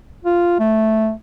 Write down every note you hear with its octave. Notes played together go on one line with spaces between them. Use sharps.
F4
A3